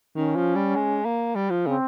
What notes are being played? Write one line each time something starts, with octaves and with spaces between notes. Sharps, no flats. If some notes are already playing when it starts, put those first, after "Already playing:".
D#3 C#4
F3
G3
G#3
A#3
G3
F3
C#3 C4